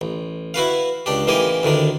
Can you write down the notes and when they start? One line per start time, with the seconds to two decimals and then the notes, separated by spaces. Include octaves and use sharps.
0.01 A1
0.54 E4 F#4 B4 F5
1.06 C#2 D4 G4
1.27 A1 E3 A#3 D#4 G4 G#5
1.63 D2 A2 D#3 D4